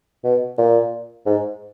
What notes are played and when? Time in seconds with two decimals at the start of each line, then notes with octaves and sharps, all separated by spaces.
0.24 B2
0.58 A#2
1.26 G#2